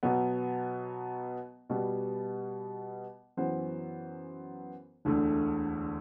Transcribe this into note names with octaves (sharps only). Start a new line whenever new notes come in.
B2 F#3 B3
B2 G3 B3
F#2 E3 B3 F#4 C5
E1 D2 D3 A3